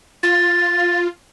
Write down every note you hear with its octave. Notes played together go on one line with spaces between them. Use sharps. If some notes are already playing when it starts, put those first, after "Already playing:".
F4 A6